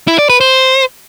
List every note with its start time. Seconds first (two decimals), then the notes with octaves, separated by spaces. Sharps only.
0.07 E4
0.18 D5
0.30 B4
0.41 C5